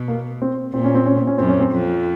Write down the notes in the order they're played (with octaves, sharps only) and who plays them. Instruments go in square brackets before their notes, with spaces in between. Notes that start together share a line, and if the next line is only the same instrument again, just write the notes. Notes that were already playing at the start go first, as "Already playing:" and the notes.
Already playing: [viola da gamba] B2
[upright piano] A#3
C4
[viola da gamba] A#2 [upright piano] C4
[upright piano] C#4
C4
C#4
C4
C#4
[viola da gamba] F#2 [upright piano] C4
[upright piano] C#4
C4
[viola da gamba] F2